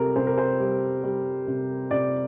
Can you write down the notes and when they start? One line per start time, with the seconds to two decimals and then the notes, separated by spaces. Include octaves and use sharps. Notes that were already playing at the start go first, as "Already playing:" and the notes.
Already playing: C3 G3 G4 A4 A#4
0.16 C3 C5
0.27 A#4
0.38 C5
0.60 G3
1.04 G3
1.47 C3
1.91 C3 D5